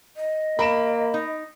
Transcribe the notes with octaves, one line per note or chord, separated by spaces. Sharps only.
D#5
A#3 A#4 B5 D7 E7
D#4